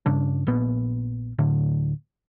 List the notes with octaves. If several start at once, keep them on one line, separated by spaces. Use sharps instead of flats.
G2 C#3 D4
A#1 A#2 B3
D1 A2 D3